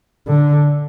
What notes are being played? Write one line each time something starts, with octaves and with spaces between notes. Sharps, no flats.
D3